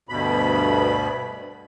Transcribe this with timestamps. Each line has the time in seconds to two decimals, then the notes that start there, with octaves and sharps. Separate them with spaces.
0.09 D2 G2 B2 B5